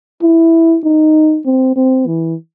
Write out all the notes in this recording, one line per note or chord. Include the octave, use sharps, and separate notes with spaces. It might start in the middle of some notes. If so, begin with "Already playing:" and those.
E4
D#4
C4
C4
E3